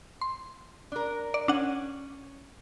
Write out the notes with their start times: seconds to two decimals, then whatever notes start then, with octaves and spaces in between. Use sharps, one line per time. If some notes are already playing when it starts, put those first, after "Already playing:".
0.21 C6
0.92 D4 A#4
1.34 D5
1.48 C#4 D4 F#5